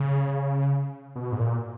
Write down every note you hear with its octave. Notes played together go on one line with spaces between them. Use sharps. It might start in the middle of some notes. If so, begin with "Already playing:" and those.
Already playing: C#3
B2
G#2
A#2